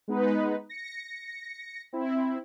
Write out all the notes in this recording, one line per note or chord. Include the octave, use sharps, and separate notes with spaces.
G#3 B3 D#4 B4
A#6 C#7
C4 E4